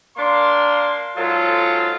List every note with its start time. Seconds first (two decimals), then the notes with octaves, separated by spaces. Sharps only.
0.17 A#3 D4 C6
1.16 G#2 F#3 F4 A4